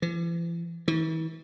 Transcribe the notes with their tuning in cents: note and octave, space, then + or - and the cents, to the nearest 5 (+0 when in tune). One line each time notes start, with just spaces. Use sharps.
E3 +45
E3 -40